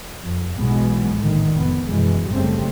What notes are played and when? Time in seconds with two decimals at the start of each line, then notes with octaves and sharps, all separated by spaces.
0.19 F2
0.57 B1 B2 E3 F#3 G#3 B3
1.18 A#1 A2 D3 D#3
1.55 F1 B3
1.89 F#2 B2 E3 G#3
2.31 F#1 G2 C#3 G3 A3 C4